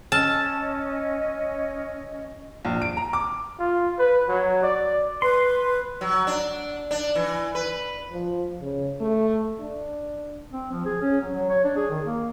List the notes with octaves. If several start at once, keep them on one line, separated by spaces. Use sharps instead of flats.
C#4 D#5 A5 E6 F6
A#1
D7
A#5
D6
F4
B4
F#3
D5
B4 C6
F#3
D4
D4
E3
B4
F3
C#3
A3
D4
C4
F3
G#4
C#4
F#3
F#3
C#5
D4
G#4
D#3
A#3